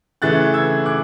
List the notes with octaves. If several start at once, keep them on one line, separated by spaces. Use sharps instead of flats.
C#3 E3 A3 F#6 A6
E6 G#6
D6 F#6